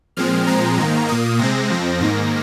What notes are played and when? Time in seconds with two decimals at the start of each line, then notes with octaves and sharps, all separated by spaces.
0.17 A#2 F3 G#3 C4 F6
0.47 A#2 F3 G#3 C4 A#5
0.77 G#2 D#3 A#3
1.08 A#2 A#3 D#6
1.39 C3 G#3 C4 A#6
1.70 F2 F3 C4
2.00 G#2 D#3 A#3 A#6